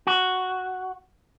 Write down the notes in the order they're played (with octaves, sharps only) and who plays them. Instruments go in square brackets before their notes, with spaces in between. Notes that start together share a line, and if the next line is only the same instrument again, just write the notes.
[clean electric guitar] F#4